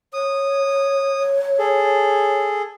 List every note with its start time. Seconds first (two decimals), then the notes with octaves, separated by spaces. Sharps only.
0.13 C#5 D#6
1.59 G#4 A4